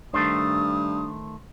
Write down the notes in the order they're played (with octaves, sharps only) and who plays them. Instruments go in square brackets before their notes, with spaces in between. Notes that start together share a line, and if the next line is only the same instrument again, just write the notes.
[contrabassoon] G2 [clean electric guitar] D#3 A3 C5 [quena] D#6